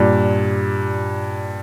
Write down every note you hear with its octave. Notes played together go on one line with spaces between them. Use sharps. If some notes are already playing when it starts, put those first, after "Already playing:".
Already playing: G2 A#2